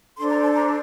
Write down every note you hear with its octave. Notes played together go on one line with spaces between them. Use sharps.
D4 A4 C5 C6
A#5
A5
A#5